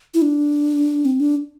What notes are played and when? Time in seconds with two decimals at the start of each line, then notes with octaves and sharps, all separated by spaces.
0.14 E4
0.22 D4
1.05 C4
1.20 D4